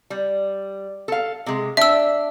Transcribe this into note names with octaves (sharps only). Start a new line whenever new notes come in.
G3
A4 F5
C3 G#3
D4 E5 E6